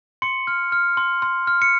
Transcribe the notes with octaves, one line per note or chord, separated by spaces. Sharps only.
C6 C#7
F6
F6
C6
C6
F6
C#7